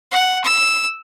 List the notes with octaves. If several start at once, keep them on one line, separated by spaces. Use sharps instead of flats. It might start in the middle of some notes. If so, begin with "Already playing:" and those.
F#5
E6